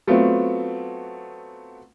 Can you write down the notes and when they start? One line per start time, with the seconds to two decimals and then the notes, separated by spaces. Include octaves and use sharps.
0.07 F#3 A3 B3 C4 F4